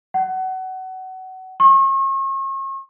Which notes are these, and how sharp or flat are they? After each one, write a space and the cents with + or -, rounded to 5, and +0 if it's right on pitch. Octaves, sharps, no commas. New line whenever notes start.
F#5 +25
C#6 -40